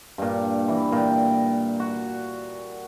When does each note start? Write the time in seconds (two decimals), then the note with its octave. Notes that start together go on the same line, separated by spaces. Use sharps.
0.18 G2 A#2
0.68 E3
0.92 A#2 G5
1.80 F#4